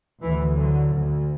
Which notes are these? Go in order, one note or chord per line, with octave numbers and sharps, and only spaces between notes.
D2 E3
D3 F#3
D2